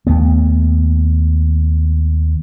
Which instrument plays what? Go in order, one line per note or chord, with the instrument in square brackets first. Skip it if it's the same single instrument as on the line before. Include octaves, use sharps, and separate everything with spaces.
[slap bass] D#2 A3 B3